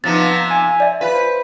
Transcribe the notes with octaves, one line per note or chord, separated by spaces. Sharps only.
C3 F3 B3 D#4 A6
G#5
D5 E5
F4 B4
C5